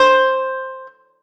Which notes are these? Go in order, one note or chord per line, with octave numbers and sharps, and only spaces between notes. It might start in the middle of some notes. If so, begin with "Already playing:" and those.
Already playing: C5